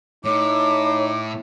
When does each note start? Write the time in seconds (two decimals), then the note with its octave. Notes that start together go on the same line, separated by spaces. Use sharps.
0.25 A2 D#4 C#5 D6